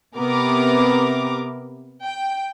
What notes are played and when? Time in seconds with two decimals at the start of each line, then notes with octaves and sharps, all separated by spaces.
0.16 C3 B3 A#4 D6
2.02 G5